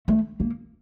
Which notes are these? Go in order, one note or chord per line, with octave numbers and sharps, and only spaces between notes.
A3
A#3